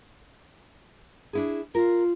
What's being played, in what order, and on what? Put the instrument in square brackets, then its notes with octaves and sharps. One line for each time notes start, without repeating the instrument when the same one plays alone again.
[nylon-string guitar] D4 E4 G#4
[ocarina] F4 [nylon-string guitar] A#4